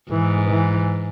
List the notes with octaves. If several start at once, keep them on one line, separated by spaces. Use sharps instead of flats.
G#2 E3
E3